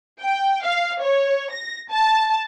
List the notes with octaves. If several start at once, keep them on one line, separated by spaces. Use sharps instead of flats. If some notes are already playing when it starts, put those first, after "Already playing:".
G5
F5
C#5
A#6
A5